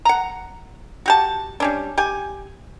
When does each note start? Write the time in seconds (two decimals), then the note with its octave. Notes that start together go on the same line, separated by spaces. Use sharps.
0.05 F#5 A#5
1.06 F#4 G4 A5
1.60 G3 C#4 D4
1.98 G4 G#5